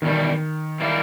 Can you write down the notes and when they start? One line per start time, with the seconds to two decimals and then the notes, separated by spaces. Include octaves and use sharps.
0.02 E2 B2 D#3 G3
0.80 E3 G3 A#3 E4